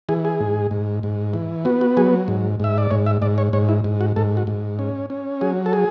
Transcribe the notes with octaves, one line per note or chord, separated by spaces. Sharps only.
E3 G#4
G#4
G#2
G#2
G#2
E3
B3 F#4
F#4
F#3 G#4
G#2
G#2 E5
D5
G#2 C#5
E5
G#2 D5
C#5
G#2 C#5
E4
G#2
F#4
G#2 A4
F#4
G#2
C#4
C#4
F#3 G#4
A4
G#4